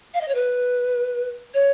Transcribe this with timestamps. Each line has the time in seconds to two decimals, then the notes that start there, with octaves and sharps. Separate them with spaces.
0.14 F5
0.21 D#5
0.28 C#5
0.35 B4
1.54 C#5